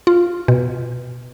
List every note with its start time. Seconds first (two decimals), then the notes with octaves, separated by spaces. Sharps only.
0.07 F4
0.48 B2